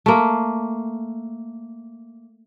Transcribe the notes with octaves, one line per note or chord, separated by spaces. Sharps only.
A3 A#3